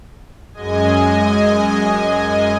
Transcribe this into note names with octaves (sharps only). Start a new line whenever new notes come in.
F#2 G#3 D#5 G#5